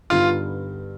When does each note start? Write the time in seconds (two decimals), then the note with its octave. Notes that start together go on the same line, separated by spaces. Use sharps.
0.10 G2 D3 G3 B3 D#4 F4